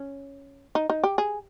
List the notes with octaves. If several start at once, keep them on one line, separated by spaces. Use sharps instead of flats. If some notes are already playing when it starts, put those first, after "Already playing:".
Already playing: C#4
D#4
D#4
G4
G#4